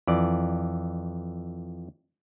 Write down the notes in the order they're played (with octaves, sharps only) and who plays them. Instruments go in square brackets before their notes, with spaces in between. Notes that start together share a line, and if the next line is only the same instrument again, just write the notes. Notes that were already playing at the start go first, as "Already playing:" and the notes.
[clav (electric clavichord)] F2 E3 D5